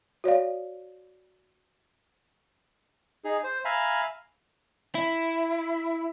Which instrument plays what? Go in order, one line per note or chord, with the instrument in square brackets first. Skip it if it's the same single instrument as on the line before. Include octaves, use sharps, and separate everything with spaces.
[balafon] F#4 C#5 D5 F5
[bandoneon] D#4 G#4
C5
E5 F5 G#5 A#5 B5
[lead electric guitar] E4